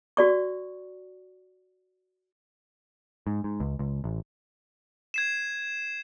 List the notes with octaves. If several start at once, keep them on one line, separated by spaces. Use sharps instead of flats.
F#4 D5 C#6
G#2
G#2
C#2
C#2
A1
G#6 C7 E7